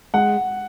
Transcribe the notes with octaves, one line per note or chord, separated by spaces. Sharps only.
G#3 F#5